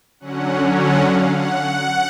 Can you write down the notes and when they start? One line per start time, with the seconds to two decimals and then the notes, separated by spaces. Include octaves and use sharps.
0.20 D3 F#3 C#4 F#5
0.79 F#5
1.07 F5
1.36 F#5